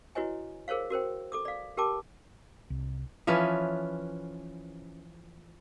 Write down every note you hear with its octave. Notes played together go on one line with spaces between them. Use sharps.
E4 F#4 B4 C#5 D#5 G#5
G#4 A#4 C5 C#5 F5
F#4 A#4 C5 G5
A4 D6 D#6
D5 F5
G4 A#4 G5 A5 D6
C2
E3 F3 C#4 B4